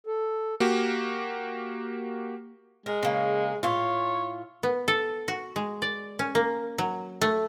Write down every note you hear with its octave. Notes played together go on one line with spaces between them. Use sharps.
A4
A#3 F#4 G4
G#3 A#4
C#3 A#3
A2 F4 C#5
B3
A4
F#4
G#3
D5
C#4
A#3
F#3
A3